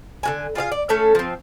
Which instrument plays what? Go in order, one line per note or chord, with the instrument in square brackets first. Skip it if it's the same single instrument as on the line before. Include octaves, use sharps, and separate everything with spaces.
[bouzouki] D3 F#4 G#5
F4 G#4 D5 F5
D5
A3 C#4 A4 C#5
F3 C4